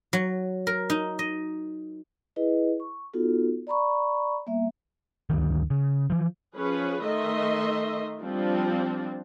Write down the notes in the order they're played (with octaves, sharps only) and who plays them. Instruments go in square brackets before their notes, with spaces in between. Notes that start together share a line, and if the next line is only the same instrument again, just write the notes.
[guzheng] F#3
A#4
D#4
D#5
[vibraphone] E4 G#4 B4 D#5
C#6
B3 D#4 F4 F#4 A4
D5 A#5 B5 C#6
G3 A#3 B3 E5
[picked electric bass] D2 G2 D#3
C#3
E3 F3
[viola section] F3 C#4 G#4 B4
D#3 A3 D#5 E5 C6
F3 G3 C4 D4